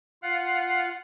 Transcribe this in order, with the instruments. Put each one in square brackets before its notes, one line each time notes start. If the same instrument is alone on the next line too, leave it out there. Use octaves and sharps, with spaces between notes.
[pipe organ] F4 F5 F#5